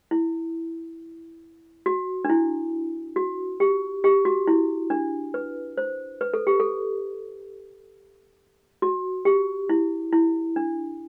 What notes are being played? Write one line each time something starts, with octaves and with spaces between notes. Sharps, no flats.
E4
F#4
D4
E4
F#4
G4
G4
F#4
E4
D4
B4
C5
B4
A4
G4
A4
F#4
G4
E4
E4
D4